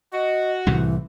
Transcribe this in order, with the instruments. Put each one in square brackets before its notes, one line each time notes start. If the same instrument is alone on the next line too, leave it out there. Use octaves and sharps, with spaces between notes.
[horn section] F#4 [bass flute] D#5
[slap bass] C2 A2 C3 [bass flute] E3